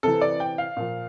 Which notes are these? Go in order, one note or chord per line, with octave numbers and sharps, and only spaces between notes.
C3 E3 A4
D5
G5
F5
A#2 F3